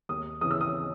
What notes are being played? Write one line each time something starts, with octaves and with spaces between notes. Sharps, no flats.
D#2 D#6
C#3 E3 D#6
E6
D#6